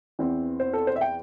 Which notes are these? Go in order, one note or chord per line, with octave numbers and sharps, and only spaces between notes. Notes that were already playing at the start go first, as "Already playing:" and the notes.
E2 E3 C4
C5
A4
C5
E5
G5